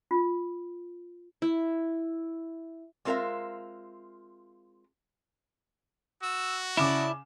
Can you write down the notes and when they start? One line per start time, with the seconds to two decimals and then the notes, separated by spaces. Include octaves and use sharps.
0.11 F4
1.42 E4
3.05 G#3 C4 F4 A#4 E5 F5
6.23 F#4 E6
6.77 C#3 E4 D5 A5 D6 E7